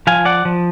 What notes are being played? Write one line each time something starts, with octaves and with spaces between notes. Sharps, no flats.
F3 F5 G#5
D5 F#5
F3